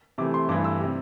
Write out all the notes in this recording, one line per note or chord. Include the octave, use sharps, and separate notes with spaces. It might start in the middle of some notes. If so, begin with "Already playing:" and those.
C3 E3 A3 D6
C6
G2 E3 A3 D6
E6
C3 G3